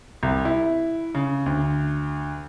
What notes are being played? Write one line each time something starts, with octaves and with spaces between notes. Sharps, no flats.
C2
E4
C#3
D2